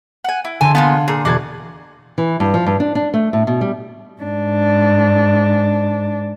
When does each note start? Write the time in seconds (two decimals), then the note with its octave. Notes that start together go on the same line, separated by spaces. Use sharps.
0.24 F#5 G#5
0.45 E4
0.61 D3 G#5 A5 C6
0.75 A#2 D#3 B3 F4 F#5 G#5
1.08 A#2 G#4
1.25 E1 D4 F#4 A5 G#6
2.18 E3
2.40 G2
2.54 F3
2.66 G2
2.80 D4
2.95 D4
3.14 A3
3.33 A2
3.47 B2
3.61 G3
4.22 G#2 D4